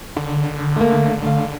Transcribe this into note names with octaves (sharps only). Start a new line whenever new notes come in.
D3
A3 A#3
A3 F5